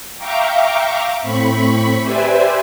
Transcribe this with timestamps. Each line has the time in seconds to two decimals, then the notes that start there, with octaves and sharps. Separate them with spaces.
0.17 E5 F5 G5 A#5 C#6 D6
1.19 A2 C4 B5 C#6 B6
2.02 G4 B4 C5 D5 E5 G#5